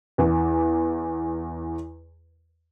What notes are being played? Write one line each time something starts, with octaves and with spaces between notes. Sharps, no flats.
E2 E3